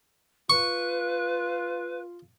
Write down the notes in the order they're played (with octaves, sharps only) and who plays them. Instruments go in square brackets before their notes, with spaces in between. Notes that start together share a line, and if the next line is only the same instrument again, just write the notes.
[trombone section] F4 [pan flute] B4 [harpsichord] C#6